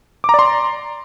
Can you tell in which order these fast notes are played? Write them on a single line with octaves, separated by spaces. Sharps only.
D6 A#5 D5 C6